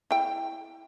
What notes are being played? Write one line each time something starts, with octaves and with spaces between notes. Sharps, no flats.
E4 G5